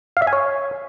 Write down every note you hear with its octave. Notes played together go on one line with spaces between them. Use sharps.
F5
E5
G#5
C#5